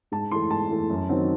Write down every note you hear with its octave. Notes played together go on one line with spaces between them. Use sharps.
G#2 A5
E3 A3 C6
G#2 A5
E3 A3
F#2
D#3 F#3 C4